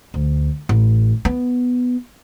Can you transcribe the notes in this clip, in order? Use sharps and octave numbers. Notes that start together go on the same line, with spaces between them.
D2
A1
B3